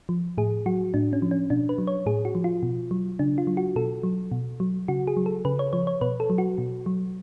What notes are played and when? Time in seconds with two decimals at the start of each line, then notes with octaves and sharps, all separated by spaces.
0.09 F3
0.38 A2 G#4
0.66 F#3 F#4
0.94 A2 D4
1.13 C#4
1.22 F3
1.31 C#4
1.50 B2 D4
1.69 B4
1.78 F#3
1.87 C#5
2.06 A2 G#4
2.25 F#4
2.35 F3
2.44 F4
2.63 B2
2.91 F#3
3.19 C#3 D4
3.38 F4
3.47 F#3
3.57 F#4
3.76 B2 A4
4.03 F#3
4.32 B2
4.60 F#3
4.88 C#3 F#4
5.07 G#4
5.17 F#3
5.26 A4
5.45 C#3 B4
5.59 C#5
5.73 F3 C#5
5.87 C#5
6.01 B2 B4
6.20 A4
6.30 F#3
6.38 F#4
6.58 B2
6.86 F#3